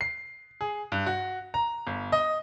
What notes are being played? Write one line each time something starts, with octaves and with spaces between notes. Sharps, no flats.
C7
G#4
G2
F#4
A#5
G1
D#5